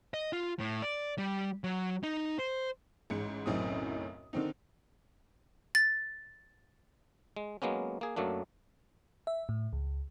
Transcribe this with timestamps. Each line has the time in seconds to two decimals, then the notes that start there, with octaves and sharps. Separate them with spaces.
0.14 D#5
0.33 F4
0.59 A2
0.82 D5
1.18 G3
1.64 F#3
2.03 D#4
2.39 C5
3.10 A1 G#2 C#7
3.46 F#1 B1 F#2 A2 C4 D#6
4.33 D3 D#3 C4 D#4
5.75 A6
7.36 G#3
7.62 F#3 G#3 A#3 B3 C#4
8.01 A#3 G#4
8.16 F#2 F#3 A3 A#3 D4
9.27 E5
9.49 A2
9.73 C#2